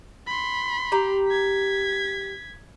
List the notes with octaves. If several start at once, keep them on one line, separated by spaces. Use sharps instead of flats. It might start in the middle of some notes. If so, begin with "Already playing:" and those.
B5 C6
G4 A#5
G#6 B6